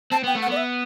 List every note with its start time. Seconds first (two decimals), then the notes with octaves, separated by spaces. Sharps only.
0.11 C4 A5
0.24 B3 G5
0.35 A3
0.42 F#5
0.47 B3 D5
0.57 E5